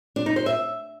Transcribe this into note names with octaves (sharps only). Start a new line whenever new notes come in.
D4
D#4
C5
E5